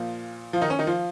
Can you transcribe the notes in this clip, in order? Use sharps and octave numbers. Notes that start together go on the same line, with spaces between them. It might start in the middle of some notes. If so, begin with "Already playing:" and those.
Already playing: A#2 F3 F4
F3 F4
D#3 D#4
C#4
D#3 D#4
F3 F4